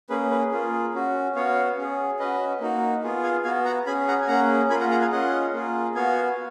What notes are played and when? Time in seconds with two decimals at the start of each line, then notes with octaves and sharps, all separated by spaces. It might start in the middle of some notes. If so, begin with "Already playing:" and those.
0.09 A#3 C#4 G#4 B4
0.31 B4
0.51 A#3 F4 G#4
0.94 C#4 F#4
1.35 B3 F#4 C#5 F5
1.77 C#4 G#4
2.19 C#4 F#4 B4 D#5
2.61 A#3 D#4 F#4
3.03 B3 F4 G#4
3.23 F5 G#5
3.44 B3 F#4 F5 G#5
3.65 F#5 A#5
3.86 C#4 G#4 G#5 B5
4.08 F#5 A#5
4.21 G#5
4.28 A#3 C#4 G#4 F#5 A#5
4.70 A#3 F4 G#4 G#5 B5
4.80 F#5 A#5
4.91 F#5 A#5
5.01 F5 G#5
5.12 C#4 F4 G#4 D#5 F#5
5.54 A#3 F4 G#4
5.95 B3 F#4 F5 G#5